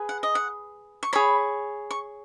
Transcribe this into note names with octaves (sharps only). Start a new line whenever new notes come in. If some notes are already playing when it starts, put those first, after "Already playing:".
Already playing: G#4 B4
F#5
D#5
F#5
C#6
G#4 C#5 B5
C#6